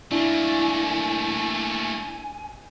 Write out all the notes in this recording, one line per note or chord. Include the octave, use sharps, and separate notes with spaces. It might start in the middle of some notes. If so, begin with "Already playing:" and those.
A3 A#3 D4 E4 G#5